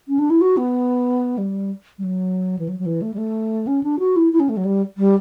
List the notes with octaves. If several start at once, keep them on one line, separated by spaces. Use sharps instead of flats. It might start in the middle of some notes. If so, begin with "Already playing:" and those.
C#4
D4
E4
F#4
B3
G3
G3
F#3
E3
F#3
F#3
E3
A3
G3
A3
C#4
D4
F#4
E4
E4
C#4
A3
F#3
G3
G3